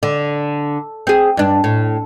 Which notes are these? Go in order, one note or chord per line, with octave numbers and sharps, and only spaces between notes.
D3
C4 G#4
G2 D4
A2